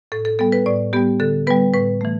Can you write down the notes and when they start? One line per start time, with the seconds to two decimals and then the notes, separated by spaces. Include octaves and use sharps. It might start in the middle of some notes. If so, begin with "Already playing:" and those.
0.12 A2 A4
0.25 A4
0.39 G3 B3 A4
0.52 B4
0.66 A2 D5
0.93 G3 B3 G4
1.20 D3 A4
1.47 G3 B3 B4
1.74 A2 B4
2.01 E3 A3